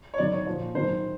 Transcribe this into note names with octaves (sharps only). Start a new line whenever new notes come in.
C#5
G#2 D#3 F#3 D5
C#5
A#2 F3
G#2 D#3 F#3 C5